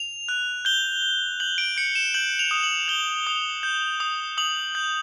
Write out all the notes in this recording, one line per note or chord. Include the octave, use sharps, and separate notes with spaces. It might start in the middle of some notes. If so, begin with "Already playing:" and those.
Already playing: F7
F#6
G6 G7
G6
G6 F#7
D7
G6 C#7
E7
G6 F#7
F7
D#6
F#7
G6 G7
D#6
G6
D#6
D#6 F#7
G6